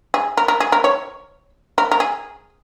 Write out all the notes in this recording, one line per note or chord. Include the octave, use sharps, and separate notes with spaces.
G#4
A#4
A#4
G#4
A#4
C#5
A#4
A#4
G#4